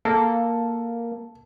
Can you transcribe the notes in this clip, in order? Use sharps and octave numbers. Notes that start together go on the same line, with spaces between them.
A#3 A4